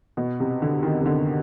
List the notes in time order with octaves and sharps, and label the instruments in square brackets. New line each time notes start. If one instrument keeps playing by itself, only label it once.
[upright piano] B2
C3
D3
D#3
C3
D3